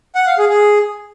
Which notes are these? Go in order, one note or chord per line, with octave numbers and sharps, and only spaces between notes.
F#5
F5
G#4
G#4